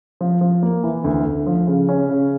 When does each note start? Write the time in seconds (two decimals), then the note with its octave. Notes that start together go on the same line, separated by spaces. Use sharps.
0.21 F3
0.41 F3
0.63 A#3
0.84 E3
1.04 D2
1.25 D2
1.46 F3
1.67 C#3
1.89 C#4
2.09 C#3